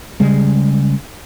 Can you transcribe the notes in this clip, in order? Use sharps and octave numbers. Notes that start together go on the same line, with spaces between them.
C#3 G3 G#3